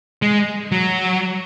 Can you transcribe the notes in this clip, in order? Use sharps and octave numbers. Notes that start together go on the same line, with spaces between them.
G#3
F#3